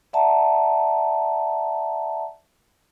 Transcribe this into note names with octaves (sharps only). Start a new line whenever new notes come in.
D5 E5 F#5 A5 A#5